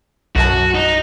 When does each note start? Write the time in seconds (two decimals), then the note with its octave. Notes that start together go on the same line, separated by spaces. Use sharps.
0.36 B1 F#2 F#4 A5
0.75 D#4